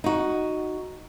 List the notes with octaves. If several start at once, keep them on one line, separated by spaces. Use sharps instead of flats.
D#4 F#4